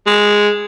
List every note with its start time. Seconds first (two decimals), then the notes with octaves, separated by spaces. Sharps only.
0.07 G#3